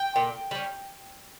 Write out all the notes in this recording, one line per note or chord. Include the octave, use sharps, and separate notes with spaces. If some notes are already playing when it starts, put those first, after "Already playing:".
Already playing: G5
A#2
G3 C#4